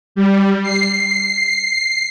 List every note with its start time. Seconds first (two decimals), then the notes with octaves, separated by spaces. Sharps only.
0.15 G3
0.63 C7